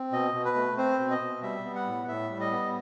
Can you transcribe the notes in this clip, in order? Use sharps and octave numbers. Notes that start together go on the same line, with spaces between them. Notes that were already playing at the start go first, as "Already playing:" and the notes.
Already playing: C4
B2 D#5
B2
B4
A3
C4 C5
B2
D#5
B2
G3 E5
B3
F#5
A2
A2 E5
G3
D#5
B3